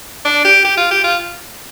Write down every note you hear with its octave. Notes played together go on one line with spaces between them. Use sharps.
D4
G4
G4
F4
G4
F4